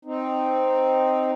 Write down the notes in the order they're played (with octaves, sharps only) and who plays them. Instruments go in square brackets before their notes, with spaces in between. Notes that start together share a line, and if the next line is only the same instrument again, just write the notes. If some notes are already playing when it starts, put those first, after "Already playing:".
[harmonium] C4 D#4